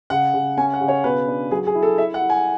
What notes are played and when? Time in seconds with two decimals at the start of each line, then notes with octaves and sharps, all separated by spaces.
0.10 C#3 F#5
0.34 C#3
0.57 C#4 G#5
0.73 F#5
0.81 C#3
0.88 C#5
1.04 B2 B4
1.28 D4
1.51 F#3 G#4
1.67 G#4
1.75 E4
1.83 A4
1.98 E4 E5
2.14 F#5
2.21 E4
2.30 G#5